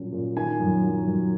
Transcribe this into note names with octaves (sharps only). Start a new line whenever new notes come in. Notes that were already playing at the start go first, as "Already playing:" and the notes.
Already playing: A#2 F#3 C#4
A#2
D#3 G#5
F#2
F#3
F#2